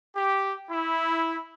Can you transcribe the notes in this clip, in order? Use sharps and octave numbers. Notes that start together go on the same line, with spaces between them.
G4
E4